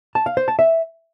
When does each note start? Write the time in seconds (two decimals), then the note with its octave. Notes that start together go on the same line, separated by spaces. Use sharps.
0.15 A5
0.26 F5
0.37 C5
0.48 A5
0.59 E5